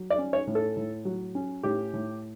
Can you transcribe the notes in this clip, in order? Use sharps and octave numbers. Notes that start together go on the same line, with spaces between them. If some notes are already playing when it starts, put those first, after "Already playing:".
Already playing: F#3
D5
C#4
C#5
A2
A4
A2
F#3
C#4
A2 G4
A2